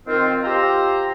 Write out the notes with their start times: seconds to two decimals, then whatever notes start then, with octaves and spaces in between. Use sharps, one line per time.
0.07 D#3 C4 F4
0.44 F4 G4 C5 A#5 C6 E6